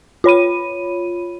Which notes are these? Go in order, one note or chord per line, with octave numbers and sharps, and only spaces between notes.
F4 C#5 B5 D#7